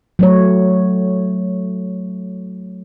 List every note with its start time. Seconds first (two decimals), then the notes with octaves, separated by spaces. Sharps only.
0.19 F#3 A3 C#5